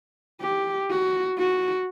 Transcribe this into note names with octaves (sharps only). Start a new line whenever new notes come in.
G4
F#4
F#4